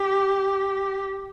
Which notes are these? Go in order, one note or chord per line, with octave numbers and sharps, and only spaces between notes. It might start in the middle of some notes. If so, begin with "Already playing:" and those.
Already playing: G4